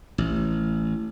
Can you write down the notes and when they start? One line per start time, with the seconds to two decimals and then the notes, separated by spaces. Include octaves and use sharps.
0.18 A1